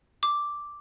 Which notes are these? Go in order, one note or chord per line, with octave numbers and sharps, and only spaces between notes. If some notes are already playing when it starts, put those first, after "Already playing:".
D6